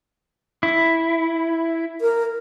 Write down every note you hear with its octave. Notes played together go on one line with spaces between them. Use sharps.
E4
A#4